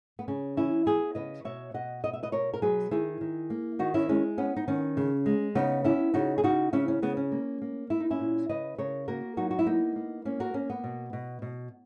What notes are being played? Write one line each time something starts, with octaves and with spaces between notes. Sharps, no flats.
B3
C#3 C#4
E3 C#4 E4
B3 E4 G#4
C#3 B4 D#5
B2 C#5 E5
B2 D#5 F#5
B3 D#5
E5
B4 D#5
B2 A#4 C#5
A#4
F#3 G#4 B4
D#3 E4 G#4
D#3
A#3
D#3 D#4 F#4
C#4 E4
G#3 C#4
B3 C#4
D#4
D#3 C#4
C#3
G#3
C#3 B3 D#4
B3 C#4 E4
C#3 D#4 F#4
G#4
C#3 D#4 F#4
C#3 C#4 E4
C#4
C#3 B3
C#4
A#3
A#3
A#3 E4
D#4
C#4 E4
A#2
C#3 B4 D#5
C#3 A#4 C#5
A#3 F#4 A#4
F#3 D#4 F#4
F#4
E4
A#3 B3 D#4
A#3
A#3 C#4
F#4 A#4
A#3 C#4
B3
B2
B2
B2